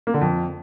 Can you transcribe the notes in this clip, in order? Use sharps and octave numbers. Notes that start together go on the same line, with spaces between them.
A#3
D3
F2